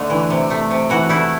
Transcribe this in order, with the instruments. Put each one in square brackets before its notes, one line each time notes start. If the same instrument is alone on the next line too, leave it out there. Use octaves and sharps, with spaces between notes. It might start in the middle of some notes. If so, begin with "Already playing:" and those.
Already playing: [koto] D3 A3
E3
C3
A3
C3
E3 F#4
A3 E4